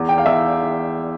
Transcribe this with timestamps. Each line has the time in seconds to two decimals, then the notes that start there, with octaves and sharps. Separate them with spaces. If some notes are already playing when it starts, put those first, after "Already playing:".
Already playing: E2
0.09 G5
0.18 F5
0.26 E2 E5